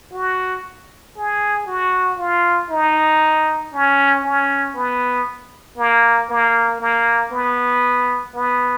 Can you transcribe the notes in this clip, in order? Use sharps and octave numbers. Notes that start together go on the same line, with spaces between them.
F#4
G#4
F#4
F4
D#4
C#4
C#4
B3
A#3
A#3
A#3
B3
B3